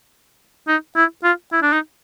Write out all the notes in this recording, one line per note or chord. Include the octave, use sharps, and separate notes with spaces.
D#4
E4
F4
E4
D4
D#4